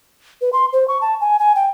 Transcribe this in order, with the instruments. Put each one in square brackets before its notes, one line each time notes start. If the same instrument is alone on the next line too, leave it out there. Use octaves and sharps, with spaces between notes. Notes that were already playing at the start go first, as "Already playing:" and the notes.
[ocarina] B4
C6
C5
C#6
A5
G#5
G#5
G5